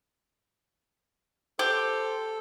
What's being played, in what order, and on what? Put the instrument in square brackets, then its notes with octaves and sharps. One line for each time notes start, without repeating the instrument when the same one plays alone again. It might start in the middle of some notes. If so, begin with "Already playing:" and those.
[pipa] G4 [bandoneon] A4 [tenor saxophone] C5